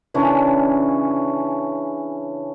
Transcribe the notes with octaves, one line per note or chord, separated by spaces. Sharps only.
C#3 E3 C#4 D4